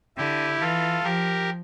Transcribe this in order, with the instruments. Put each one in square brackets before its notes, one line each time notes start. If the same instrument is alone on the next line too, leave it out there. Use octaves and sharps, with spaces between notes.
[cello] D3 [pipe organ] E4 G4
[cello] E3 [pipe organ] F4 A4
[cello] F3 [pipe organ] G4 A#4